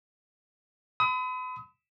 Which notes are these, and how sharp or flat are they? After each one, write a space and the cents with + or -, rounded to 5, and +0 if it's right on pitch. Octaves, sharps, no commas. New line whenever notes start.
B5 +40 D#6 +35